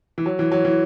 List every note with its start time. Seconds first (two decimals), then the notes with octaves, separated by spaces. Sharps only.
0.18 E3
0.26 F#3
0.39 E3
0.52 F#3
0.65 E3